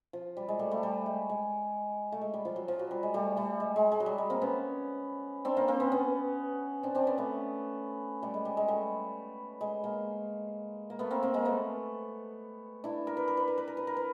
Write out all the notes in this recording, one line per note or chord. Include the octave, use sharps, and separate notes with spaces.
F3
G3
G#3
G3 A3
G3 A3
G3 A3
G#3
G#3
A3
G#3
G3
F3
F#3
F3
F#3
G3
G#3
G3 A3
G3 A3
G#3
G#3
G#3
F#3
G3
G#3
A#3 C4
B3 C#4
C4 D4
A#3 C4
A#3 C4
B3 C#4
B3 C#4
C4 D4
C4 D4
B3 C#4
A3 B3
G3 A3
G#3
G3
G#3
G3 A3
G#3
G#3 A#3
A#3
A3 B3
A#3 C4
A#3 C4
G#3 A#3
A3 B3
D4 E4
A#4
B4
A#4
B4
A#4
B4
A#4
B4
A#4
B4